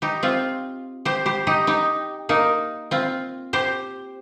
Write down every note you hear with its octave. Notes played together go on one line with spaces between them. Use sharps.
D#4 G4
C4 F4
G4 C5
G4 C5
D#4 G4
D#4 G4
A#3 D#4
C4 F4
G4 C5